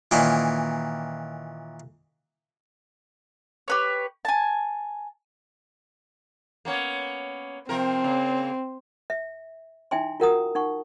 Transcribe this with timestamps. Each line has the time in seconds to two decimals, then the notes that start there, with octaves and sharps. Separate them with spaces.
0.11 A#2 D#3 E3 C#4
3.68 G4 B4 C#5
4.25 G#5 A5
6.65 A#3 B3 C#4
7.69 C3 F3 C4 A#4
8.04 C#3 A#3
9.10 E5
9.91 D#4 E4 E5 G5 G#5 C6
10.20 F4 F#4 A#4 F#5 A#5 D#6
10.55 D#4 F#5 C#6